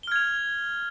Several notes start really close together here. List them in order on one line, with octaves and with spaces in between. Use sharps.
G7 F6 G#6 F7